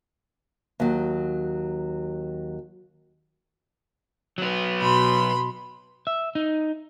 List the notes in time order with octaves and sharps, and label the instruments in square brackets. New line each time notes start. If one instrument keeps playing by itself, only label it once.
[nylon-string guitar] D#2 F#3
[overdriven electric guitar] F#3 B3
[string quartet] B2 B5 C6
[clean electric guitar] E5
D#4